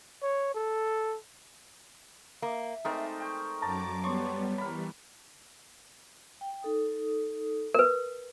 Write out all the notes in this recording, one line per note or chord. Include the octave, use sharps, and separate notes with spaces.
C#5
A4
A#3 E5
G#3 A3 C4 D#4 A#4 D5
G5 C#6
F#2 F#3 D5 A5 A#5 D6
G3 B3 C#5 D5 C6 C#6
E3 G3 A#4 B5
G5
D#4 A4 D#6
A#4 B4